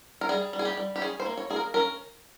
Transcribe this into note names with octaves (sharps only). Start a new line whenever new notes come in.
A#4
G3 G#4
G3
G#4
G4
G3
G4
C#4 G#4
C5
A#3
C#5
A#3 G#4
A#4
C#4 A#4